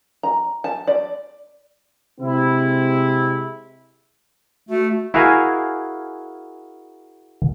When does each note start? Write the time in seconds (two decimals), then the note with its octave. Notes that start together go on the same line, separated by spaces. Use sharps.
0.23 A#5
0.64 A5
0.87 D5
2.21 C3 G#3 C4 E4
4.69 A3 F#4
5.14 E4 F#4 G#4 A#4 F5 G#5